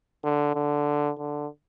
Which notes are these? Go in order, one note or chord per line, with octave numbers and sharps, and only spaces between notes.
D3
D3
D3